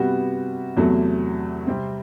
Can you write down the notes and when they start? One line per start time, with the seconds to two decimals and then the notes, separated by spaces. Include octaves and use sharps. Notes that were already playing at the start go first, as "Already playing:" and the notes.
Already playing: C3 G3 B3 F#4
0.77 E2 C3 F#3 A3
1.67 C3 G3 C4